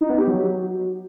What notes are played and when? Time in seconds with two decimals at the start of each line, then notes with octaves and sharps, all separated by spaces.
0.01 D#4
0.10 B3
0.18 G4
0.27 F#3